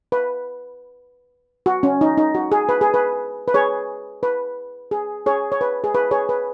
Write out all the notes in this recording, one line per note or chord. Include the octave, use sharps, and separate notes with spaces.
B4
F#4
C#4
D#4
D#4
F#4
G#4
B4
G#4
B4
B4
G#4 C#5
B4
G#4
G#4 C#5
C#5
B4
G#4
B4
G#4 C#5
B4